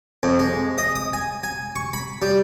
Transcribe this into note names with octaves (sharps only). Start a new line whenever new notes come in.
F2
G#3
D#5
D#6
G#5
G#5
C#6
B5
G3